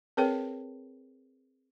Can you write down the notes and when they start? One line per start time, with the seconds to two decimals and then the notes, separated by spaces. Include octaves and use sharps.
0.17 C4 G#4 A#4 B4 C#5 G5